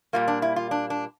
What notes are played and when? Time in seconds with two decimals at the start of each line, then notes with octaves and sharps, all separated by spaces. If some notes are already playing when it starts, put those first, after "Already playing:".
0.13 A#2 G3 A#3 F4
0.28 D4
0.42 E4
0.56 F4
0.71 D4
0.90 D4